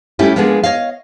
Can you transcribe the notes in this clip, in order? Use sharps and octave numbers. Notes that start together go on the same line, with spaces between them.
G3 A3 C#4 E4 F4 G4
F3 G#3 A#3 B3 D4 G#4
C#5 D#5 F5